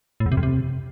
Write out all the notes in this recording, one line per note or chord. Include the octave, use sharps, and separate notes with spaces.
A2
E2
C3
F2
C3